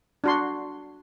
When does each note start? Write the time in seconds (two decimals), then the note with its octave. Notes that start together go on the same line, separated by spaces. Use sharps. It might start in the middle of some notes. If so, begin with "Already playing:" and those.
0.24 D4 F#4 C6